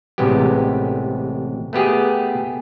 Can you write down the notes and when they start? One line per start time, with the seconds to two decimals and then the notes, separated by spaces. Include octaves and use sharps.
0.18 A1 C3 E3 G#3 B3 G4
1.73 A3 B3 G4 G#4